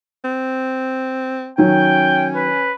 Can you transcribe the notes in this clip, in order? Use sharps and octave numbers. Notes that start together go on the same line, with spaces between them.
C4
D#3 F#3 C#4 G5
B4